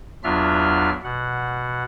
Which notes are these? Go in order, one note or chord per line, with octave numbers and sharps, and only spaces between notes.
E2 F#3 D4 F4 E5 F6
B2 F#5